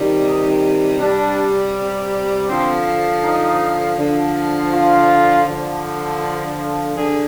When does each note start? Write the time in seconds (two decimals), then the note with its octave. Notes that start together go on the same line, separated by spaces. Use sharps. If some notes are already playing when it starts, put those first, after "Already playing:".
Already playing: C3 D#3 G3
0.25 D#4
0.99 C3 G3 D4
2.48 D3 F3 C4
3.23 D#4
3.98 D3 F3
4.73 F4
5.46 D3 F3
6.96 D3 G#4